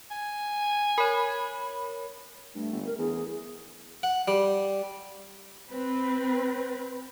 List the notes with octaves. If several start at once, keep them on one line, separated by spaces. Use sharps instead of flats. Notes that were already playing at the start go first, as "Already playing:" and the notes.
G#5
A#4 C#5 B5
G2 A3
G1
A#4
E2 G#4
F#5
G3
C4 B4